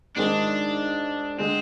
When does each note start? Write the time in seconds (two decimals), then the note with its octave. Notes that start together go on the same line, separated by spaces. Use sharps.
0.16 G#2 D#3 G#3 D4
1.38 D3 G#3 C4